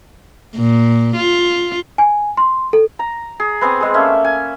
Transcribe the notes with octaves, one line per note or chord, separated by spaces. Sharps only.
A#2
F4
G#5
C6
A4
A#5
G#4
B3 C4 G#5 D#6
G#3 G#4
A3 A#3 C#4 E5
G#5